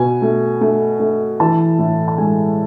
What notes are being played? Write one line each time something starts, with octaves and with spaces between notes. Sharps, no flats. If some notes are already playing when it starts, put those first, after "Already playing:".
Already playing: B2 G#5
A3
A3
A3
E3 A5
A2
A5
G#3 G#5